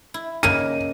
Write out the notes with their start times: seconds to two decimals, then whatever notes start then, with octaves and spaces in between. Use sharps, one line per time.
0.14 E4
0.43 C#3 A#3 D#4 D#7